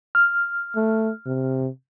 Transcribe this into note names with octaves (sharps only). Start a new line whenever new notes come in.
F6
A3
C3